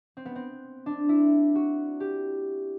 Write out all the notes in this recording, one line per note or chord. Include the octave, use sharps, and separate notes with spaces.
C4
B3
C4
D4
E4
F#4
G4